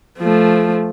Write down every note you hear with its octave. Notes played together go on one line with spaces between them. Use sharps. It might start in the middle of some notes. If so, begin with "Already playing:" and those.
F3 A3